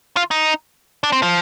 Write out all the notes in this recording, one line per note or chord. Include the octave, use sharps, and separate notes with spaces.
F4
D#4
D4
C4
F3